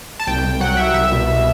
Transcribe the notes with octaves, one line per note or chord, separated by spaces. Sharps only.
A5
C2 G5
C2
F#3 F#5
C2 E5
C2 E5
B2